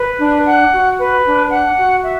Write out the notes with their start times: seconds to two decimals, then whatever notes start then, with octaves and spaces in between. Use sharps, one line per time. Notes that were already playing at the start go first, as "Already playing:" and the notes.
Already playing: B4
0.18 D4
0.45 F#5
0.72 F#4
0.99 B4
1.24 D4
1.51 F#5
1.77 F#4
2.03 E5